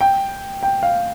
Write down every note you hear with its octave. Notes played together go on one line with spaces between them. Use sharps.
G5
G5
F5